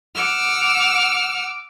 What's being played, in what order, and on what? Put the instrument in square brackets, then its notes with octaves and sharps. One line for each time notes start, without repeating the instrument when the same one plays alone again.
[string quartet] F#5 D6 E6 F6